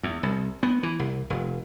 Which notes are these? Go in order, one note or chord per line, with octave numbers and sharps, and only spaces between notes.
E2
C2
B3
E3
C2
F1